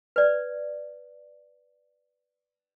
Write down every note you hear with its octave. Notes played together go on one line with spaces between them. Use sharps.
B4 D5